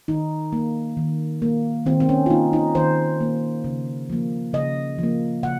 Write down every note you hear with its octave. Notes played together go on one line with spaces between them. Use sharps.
D#3 D#4
A#3
D#3
A#3
D#3 C4
C4
C#4
F4
A#3 D#4
D#4
D#3 C5
A#3
C#3
F3 A#3
C#3 D#5
F3 A#3
C#3 F#5